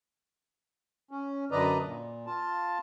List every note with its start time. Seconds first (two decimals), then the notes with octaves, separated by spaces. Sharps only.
1.11 C#4
1.51 F#2 D3 B4 D5 D#5 A#5
1.84 A#2
2.26 F4 A5